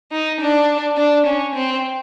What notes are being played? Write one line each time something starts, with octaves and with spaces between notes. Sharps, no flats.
D#4
D4
D4
C#4
C4